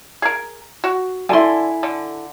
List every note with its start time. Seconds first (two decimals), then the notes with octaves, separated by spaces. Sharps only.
0.22 G#4 A#4
0.84 F#4
1.29 D3 E4 A4 G#5 C6
1.83 D3